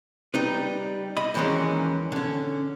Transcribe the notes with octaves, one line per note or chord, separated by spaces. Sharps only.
G3 D#4 B4
D#5 B5
D#2 E3 F#3 G#3 A#3 C#4
D3 C#4